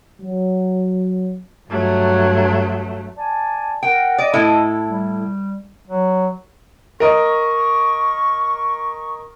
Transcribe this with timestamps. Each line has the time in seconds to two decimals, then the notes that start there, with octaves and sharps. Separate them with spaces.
0.21 F#3
1.68 G2 F#3 A3
3.17 D5 G#5 A5
3.83 A#4 F#5 G5
4.18 D5 D#5
4.34 A2 E4 A4
4.88 G3
5.87 F#3
7.00 A#4 D#5 C#6